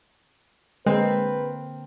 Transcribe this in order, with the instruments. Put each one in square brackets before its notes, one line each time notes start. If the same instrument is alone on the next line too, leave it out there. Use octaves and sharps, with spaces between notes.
[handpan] D3 A#3 A#4 [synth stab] G#3 [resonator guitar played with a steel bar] C4 [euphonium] B4